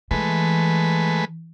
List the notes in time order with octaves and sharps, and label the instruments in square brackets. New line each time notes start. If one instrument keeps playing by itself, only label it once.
[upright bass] E3 [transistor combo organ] G#3 A3 B4